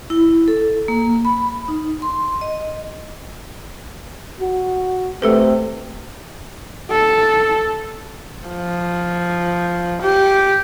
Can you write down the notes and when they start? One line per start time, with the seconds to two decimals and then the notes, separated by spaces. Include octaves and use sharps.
0.10 E4
0.48 A4
0.88 A#3
1.25 B5
1.68 D#4
2.02 C6
2.41 D#5
4.40 F#4
5.22 C3 A3 A4 B4
6.91 A4
8.49 F3
10.02 G4